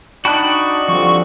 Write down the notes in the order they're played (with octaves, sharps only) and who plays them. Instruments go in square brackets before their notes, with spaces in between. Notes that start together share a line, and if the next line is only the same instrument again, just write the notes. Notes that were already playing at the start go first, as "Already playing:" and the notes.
[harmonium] D4 D#4 D5 [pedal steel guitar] F#4 G5 F#6 [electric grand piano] A5 B5
[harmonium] D3 G3 C4 [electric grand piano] F3 [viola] C#6